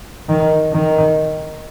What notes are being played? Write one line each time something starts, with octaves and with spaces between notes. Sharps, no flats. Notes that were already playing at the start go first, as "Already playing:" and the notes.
D#3
D#3